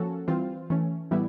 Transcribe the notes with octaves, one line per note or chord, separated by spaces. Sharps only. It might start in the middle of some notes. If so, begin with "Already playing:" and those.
Already playing: F3 A#3 C#4 F#4 A4
E3 G3 C4 F4
E3 A3 C#4
A2 E3 G3 B3 E4